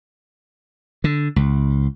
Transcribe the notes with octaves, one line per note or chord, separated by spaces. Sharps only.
D3
C#2